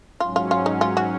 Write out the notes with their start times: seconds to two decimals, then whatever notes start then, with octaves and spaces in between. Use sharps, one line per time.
0.20 G#2 F#3 C#4 F4
0.36 F4
0.51 F4
0.66 D#4
0.81 F4
0.97 F#4